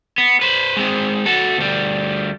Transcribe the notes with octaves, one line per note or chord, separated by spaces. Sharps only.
B3
B4 C5
G#3 C4
F#4 A4
D2 G3